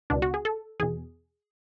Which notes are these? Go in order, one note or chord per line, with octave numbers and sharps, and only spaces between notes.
C#2 B2 D4
F#4
G#4
A4
E2 B2 G#4